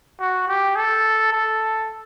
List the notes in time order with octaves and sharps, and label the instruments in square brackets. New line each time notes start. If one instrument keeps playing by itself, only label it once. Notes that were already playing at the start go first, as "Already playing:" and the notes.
[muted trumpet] F#4
G4
A4
A4